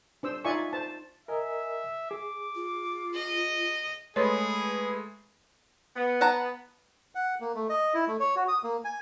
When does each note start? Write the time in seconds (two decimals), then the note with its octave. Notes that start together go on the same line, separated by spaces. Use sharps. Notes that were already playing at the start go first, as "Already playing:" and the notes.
0.23 D4 C5 E6
0.45 D#4 F4 D5 E5 G#5 C#6
0.73 C5 A5
1.28 A#4 D#5 E5 G#5
2.11 G#4 D6
2.55 F4
3.15 D#5
4.16 G#3 A3 G#4 B4 C#5 B5 C6
5.96 B3
6.21 F#5 A5 A#5
7.15 F#5
7.40 A#3
7.55 A3
7.69 D#5
7.94 E4
8.08 A3
8.20 C#5
8.36 F#4
8.48 D#6
8.64 A#3
8.85 G#5